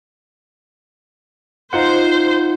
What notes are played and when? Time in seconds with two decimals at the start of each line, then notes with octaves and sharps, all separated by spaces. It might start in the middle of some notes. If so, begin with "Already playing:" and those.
1.73 D#4 F4 C5 F#5